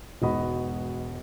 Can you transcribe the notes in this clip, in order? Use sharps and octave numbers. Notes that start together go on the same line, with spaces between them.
E1 G#2 B3 F#4 D#5 B5